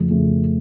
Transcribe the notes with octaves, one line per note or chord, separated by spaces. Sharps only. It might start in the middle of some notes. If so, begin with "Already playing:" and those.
Already playing: F2 C#3 F3 A3
F2 C#3 F3 A3